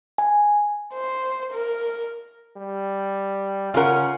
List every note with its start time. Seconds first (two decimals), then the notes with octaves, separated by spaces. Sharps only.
0.18 G#5
0.94 C5
1.53 A#4
2.56 G3
3.74 C#3 C#4 F4 A#4 F#5